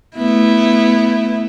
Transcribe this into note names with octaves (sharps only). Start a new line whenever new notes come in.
A3 B3 E4